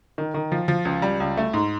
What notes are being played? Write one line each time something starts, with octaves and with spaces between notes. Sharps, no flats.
D#3
D#3
F3
F3
C#2
G3
C#2
A3
G#2